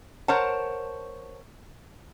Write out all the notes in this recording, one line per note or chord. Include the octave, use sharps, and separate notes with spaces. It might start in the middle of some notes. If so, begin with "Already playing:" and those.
A#4 C5 C#5 F#5 A5